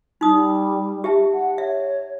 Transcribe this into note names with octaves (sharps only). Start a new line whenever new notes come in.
G3 D#4 D#6
G4 E5 A5
F#5
C#5 E5